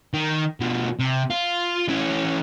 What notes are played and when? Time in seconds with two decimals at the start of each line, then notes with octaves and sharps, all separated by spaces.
0.13 D#3
0.60 B2 F3
0.99 C3
1.30 F4
1.88 E3 C#4